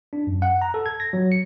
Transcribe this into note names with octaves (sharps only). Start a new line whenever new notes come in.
D4
F#2
F#5
A#5
A4
G#6
A#6
F#3
C#7